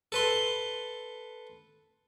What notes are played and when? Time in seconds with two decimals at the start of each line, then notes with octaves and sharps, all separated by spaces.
0.12 A4 B4 C6